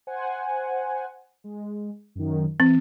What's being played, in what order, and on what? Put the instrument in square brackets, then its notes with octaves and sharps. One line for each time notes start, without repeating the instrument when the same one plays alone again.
[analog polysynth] C5 F#5 G#5
G#3
F#2 D#3
[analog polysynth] E3 [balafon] C4